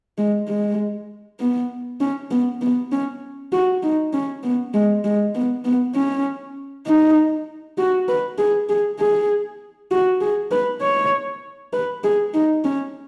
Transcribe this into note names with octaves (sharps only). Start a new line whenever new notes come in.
G#3
G#3
B3
C#4
B3
B3
C#4
F#4
D#4
C#4
B3
G#3
G#3
B3
B3
C#4
D#4
F#4
B4
G#4
G#4
G#4
F#4
G#4
B4
C#5
B4
G#4
D#4
C#4